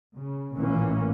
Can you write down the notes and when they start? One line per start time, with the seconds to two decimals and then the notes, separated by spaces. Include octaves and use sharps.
0.17 C#3
0.56 A1 A#2 E3 A#3 C#4